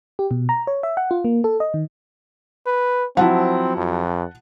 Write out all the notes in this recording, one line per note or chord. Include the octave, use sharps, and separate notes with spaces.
G4
B2
A#5
C#5
E5
F#5
F4
A#3
A4
D#5
D#3
B4
F3 F#3 C4 E4 F#5 A5
F2